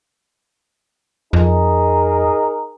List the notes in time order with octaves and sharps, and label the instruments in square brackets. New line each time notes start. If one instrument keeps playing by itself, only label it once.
[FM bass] F2 [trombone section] D#4 G#4 A#4